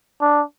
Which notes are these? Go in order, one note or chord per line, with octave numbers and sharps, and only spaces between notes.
D4